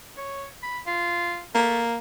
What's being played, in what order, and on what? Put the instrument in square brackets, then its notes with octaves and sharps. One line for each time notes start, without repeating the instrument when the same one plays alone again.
[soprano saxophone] C#5
B5
F4
[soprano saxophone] A3 [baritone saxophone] A#3